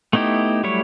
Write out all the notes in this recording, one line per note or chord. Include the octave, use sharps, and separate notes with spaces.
A3 B3 D#4 E4 G4
F#3 G3 A3 E4 C#5